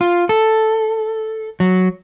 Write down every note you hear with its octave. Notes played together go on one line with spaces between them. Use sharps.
F4
A4
F#3